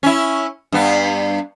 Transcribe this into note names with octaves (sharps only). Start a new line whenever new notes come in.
C#4 E4
G2 B3